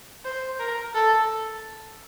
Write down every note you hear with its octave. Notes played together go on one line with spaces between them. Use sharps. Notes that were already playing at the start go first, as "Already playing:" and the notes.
C5
A#4
A4